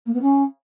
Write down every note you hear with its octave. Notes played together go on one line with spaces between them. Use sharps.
A#3
B3
C#4